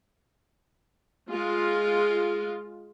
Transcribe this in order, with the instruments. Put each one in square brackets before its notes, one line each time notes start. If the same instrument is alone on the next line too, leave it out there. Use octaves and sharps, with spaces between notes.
[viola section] G#3 F4